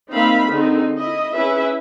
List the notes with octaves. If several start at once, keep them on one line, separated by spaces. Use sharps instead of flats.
A#3 C4 D#4 E5 F5 B5
D3 D#3 C4 D#4 G#4
E4 D#5
C#4 E4 G#4 B4 E5